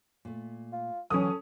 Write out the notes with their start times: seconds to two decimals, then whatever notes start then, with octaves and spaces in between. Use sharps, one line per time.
0.25 A#2 A3
0.73 F4
1.10 D3 E3 F#3 C#4 A4 D#6